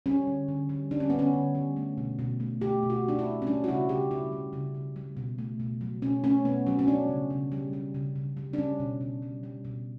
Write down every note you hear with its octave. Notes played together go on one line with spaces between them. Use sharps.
G3 C#4
D3
D3
G3
G3 D4
C#4
D3 B3
C#4
D3
G3
A3
B2
B2
A3
A3 G4
B2
F#4
B2 D4
E4
A3
C#4
G3 D4
F#4
C#3 E4
C#3 G4
G3 E4
G3
C#3
C#3
G3
B2
A3
B2
F#3
B2 C#4
A3 C#4
B2 B3
F#3 C#4
C#4
G3 D4
C#3
C#3
G3
G3
C#3
C#3
G3
D4
G3 C#4
B2
B2
G3
G3
B2